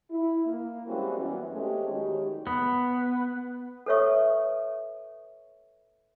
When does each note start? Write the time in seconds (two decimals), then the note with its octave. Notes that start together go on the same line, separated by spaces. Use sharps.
0.10 E4
0.46 A#3
0.87 E3 G3 G#3 C4 C#4 F#4
1.18 F#2 B2 E3
1.52 G#3 A3 C4 C#4 F#4 G4
1.89 E2 D#3 F#3 G#3 G4 C#5
2.47 B3
3.86 A4 B4 C#5 E5 C#6 D#6